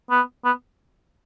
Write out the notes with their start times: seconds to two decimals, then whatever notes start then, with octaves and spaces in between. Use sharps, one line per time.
0.11 B3
0.45 B3